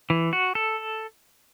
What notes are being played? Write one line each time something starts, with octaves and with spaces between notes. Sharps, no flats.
E3
F#4
A4